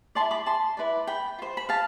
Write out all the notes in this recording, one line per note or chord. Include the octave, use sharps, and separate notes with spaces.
E4 B4 D5 A5 C6
B5 D6
A5 C6
E4 B4 D5
G5 B5
F4 C5
B5
F5 A5